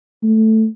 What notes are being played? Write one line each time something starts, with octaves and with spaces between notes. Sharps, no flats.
A3